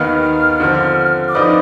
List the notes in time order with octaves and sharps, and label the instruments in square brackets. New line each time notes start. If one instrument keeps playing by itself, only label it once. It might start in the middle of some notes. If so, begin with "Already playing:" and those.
Already playing: [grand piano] D#2 D#3 B3 D#4 B4 [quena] F6
[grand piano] D3 F3 C4
[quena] D6
[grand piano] F3 C4 D#4 B4 D5 [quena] D#6